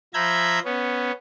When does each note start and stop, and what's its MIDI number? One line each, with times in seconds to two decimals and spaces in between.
0.14 0.59 53
0.14 0.59 76
0.14 0.59 82
0.14 0.59 83
0.14 0.59 91
0.14 0.59 92
0.65 1.11 59
0.65 1.11 61